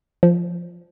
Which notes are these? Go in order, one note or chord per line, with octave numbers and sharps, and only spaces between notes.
F3